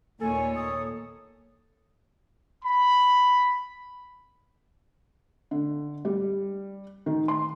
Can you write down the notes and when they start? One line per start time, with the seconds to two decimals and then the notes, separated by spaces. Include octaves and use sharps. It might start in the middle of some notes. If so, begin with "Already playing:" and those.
0.21 D#2 A#2 A4 C#5 G#5
0.55 D#6
2.64 B5
5.51 D3
6.05 G3
7.06 D#3
7.28 C6